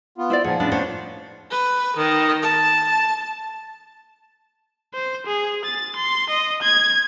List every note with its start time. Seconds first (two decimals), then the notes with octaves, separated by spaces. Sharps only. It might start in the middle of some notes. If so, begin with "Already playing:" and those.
0.18 B3 F4
0.30 E4 C5 D5
0.44 D#2 A#2 D#3 F3 G#4 F#5
0.60 A2 B3 C#4 D4
0.72 D4 C5 C#5
1.51 B4
1.97 D#3
2.43 A5
4.94 C5
5.26 G#4
5.65 A6
5.96 C6
6.30 D#5
6.62 G#6